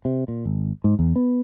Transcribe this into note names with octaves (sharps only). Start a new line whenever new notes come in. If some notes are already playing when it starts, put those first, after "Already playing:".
C3
A#2
G#1
G#2
E2
B3